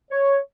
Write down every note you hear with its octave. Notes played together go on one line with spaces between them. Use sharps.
C#5